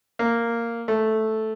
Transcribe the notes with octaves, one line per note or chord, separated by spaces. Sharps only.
A#3
A3